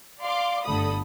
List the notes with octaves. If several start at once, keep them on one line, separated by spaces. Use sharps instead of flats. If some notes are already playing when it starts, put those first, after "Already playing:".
D5 F5 C6 D6
G1 D3 A3 A4 B5 D#6